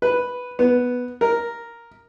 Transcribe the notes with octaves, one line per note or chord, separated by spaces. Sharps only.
B4
B3
A#4